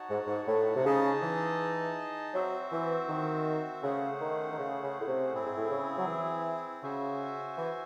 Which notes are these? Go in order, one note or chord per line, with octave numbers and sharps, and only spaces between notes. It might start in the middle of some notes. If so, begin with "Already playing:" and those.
Already playing: D#4 F#4 C#5 F#5 A5
G#2
G#2
A2
C3
C#3 D#4 G#4 D#5 A5
E3
F#3 C4 F#4 C5 E5
E3
D#3
C#3 A3 C#4 G#4 C5 F#5
D#3
D#3
C#3
C#3
A2
C3
A2 C4 E4 G#4
G#2
A2
C#3
F#3
E3
C#3 F#4 C5 E5 G#5
E3